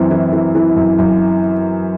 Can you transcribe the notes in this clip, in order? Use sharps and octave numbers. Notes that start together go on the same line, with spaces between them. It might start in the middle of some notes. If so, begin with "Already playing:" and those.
Already playing: F#2 E3 C4
E3
E3
E3
F#2
F#2